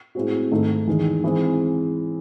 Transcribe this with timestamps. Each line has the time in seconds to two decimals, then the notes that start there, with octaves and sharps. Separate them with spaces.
0.15 A2 G#3 C4 F#4
0.52 G#2 D#3 A3 D#4
0.87 E2 D#3 G#3
1.24 E3 G#3 C4